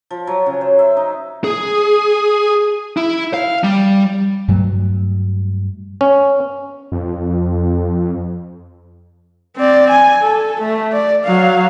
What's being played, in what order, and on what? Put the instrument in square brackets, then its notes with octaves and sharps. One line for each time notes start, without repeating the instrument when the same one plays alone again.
[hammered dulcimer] F3
F#3
C#3
C5
E5
D#4
[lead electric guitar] G#4
E4
F5
G3
[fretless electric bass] G2 F#3 A3
[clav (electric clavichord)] C#4
[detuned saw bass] F2
[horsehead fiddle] C4 D5
G#5
A4
A3
D5
F#3 F5